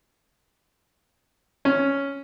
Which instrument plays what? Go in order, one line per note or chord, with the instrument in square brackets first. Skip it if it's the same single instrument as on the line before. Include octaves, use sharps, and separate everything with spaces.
[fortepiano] C#4